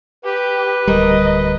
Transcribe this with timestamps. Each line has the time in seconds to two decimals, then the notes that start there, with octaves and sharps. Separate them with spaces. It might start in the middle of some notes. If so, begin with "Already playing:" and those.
0.25 G4 B4
0.88 D1 G3 A#4 D#5